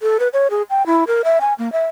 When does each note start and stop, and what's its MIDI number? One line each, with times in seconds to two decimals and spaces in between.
0.01 0.18 69
0.20 0.28 71
0.33 0.47 73
0.51 0.62 68
0.70 0.85 79
0.86 1.04 64
1.07 1.22 70
1.24 1.39 76
1.41 1.54 80
1.58 1.72 58
1.72 1.86 76